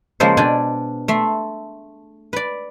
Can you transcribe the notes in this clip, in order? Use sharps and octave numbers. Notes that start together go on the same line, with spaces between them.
C#3 F3 G#3 A#3 A4 C5
B2 D4 D5 G5 G#5
A3 E5 C6
B4 D5